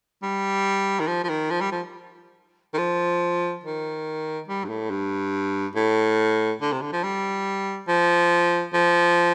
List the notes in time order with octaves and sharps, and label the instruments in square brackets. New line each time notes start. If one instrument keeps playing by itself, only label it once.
[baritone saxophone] G3
D#3
F3
F3
D#3
F3
G3
F3
D#3
F3
D#3
G3
G2
A2
G2
A2
D3
C3
D3
F3
G3
F3
F3